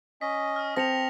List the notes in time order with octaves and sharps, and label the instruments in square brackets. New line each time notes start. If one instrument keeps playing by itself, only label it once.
[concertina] C#4 D#5 [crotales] B6
[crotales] D#6 F6
[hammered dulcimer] C4 A5 [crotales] A#6 C#7 F7